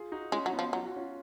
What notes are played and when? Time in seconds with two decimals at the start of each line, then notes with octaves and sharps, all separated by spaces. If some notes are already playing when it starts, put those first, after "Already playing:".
Already playing: F4 G#4
0.12 D#4 F#4
0.32 G#3 C#4 F4
0.46 F#3
0.52 B3 D#4
0.59 F3
0.73 F#3 F4
0.85 F#4
0.96 C#4 F4